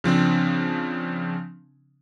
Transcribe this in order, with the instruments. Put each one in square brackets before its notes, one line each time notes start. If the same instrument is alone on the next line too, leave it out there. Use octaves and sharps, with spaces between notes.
[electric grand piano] C#3 F3 C4 D4